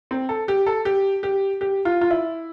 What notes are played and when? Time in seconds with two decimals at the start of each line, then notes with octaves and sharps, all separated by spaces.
0.11 C4
0.29 A4
0.48 G4
0.67 A4
0.85 G4
1.23 G4
1.61 G4
1.85 F4
2.01 F4
2.11 E4